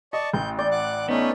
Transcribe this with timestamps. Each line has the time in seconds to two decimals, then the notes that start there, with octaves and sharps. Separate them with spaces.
0.13 D5 D#5 A5 C#6
0.33 A1 G6
0.59 D5 G6
0.71 F#5 D6 F#6
1.09 A3 B3 C#4 D#4